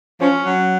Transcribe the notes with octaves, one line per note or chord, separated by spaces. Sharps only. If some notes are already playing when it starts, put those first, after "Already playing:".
F3 C#4
F#3